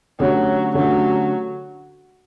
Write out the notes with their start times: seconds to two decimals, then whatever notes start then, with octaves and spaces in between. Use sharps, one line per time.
0.19 D3 F#3 A3 C#4 G4 C#5
0.74 D3 F#3 A3 C#4 G4 C#5